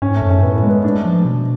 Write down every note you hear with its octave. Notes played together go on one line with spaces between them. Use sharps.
G#2 C#4
A3
F#2
C#4
A2 B3
B3
G#3
B3
A3 D4
F3
B2